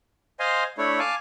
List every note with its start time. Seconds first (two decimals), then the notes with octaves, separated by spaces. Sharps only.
0.40 C5 D#5 F5 G#5 C6
0.78 A3 D4 E4 C#5
0.99 F5 G#5 A5 D6